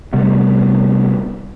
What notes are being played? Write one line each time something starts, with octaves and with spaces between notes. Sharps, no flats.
C3 G3 A3 B3